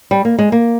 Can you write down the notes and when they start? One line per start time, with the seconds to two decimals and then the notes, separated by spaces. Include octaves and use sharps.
0.11 G3
0.25 A#3
0.39 G#3
0.52 A#3